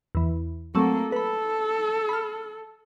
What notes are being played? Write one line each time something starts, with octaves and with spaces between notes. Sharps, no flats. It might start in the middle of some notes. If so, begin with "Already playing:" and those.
E2 E3
F#3 A3 A#3 C4 A4
A4 B4 B5
B5 F6